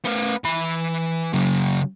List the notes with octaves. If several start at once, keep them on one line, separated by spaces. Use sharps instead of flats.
B3 A#4
E3 B5
C#3 F#3